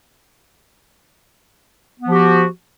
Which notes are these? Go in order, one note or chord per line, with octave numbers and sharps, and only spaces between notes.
F3 B3 F#4 G4